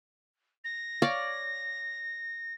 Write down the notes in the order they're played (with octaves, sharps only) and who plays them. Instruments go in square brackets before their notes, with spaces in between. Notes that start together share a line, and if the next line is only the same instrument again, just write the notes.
[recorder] A#6
[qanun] C#5 D5 F5